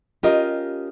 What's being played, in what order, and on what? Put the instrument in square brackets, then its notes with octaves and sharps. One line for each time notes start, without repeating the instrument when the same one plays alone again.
[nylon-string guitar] C#4 F4 A#4 [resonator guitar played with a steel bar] G4 D#5